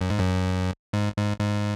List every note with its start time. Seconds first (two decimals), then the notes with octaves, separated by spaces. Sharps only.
0.01 F#2
0.10 G#2
0.19 F#2
0.93 G#2
1.17 G#2
1.40 G#2